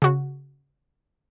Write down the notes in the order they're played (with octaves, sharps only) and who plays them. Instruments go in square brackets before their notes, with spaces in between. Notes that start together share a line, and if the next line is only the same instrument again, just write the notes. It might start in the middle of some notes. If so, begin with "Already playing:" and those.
[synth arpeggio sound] C#3 F#4